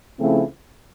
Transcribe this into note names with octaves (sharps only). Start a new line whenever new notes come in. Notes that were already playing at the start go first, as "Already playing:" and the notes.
C#3 F3 A3 C4 E4